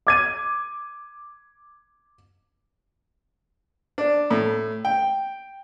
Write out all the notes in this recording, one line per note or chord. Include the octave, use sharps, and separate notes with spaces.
D6 G#6 D#7
D4
A2
G5